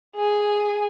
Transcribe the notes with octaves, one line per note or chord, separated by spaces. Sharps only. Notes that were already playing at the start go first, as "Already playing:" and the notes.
G#4 G#5